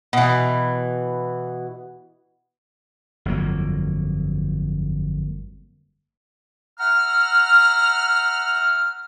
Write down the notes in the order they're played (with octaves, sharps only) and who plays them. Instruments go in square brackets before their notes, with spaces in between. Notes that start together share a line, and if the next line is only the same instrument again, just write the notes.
[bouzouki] B2 E3
[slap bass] G1 F2 F#3 A#3
[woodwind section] E5 F#5 A#5 F6